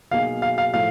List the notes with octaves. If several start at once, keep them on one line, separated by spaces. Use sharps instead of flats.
B2 F#3 A#3 D#4 G#4 F5
F5
F5
A2 F3 A3 F5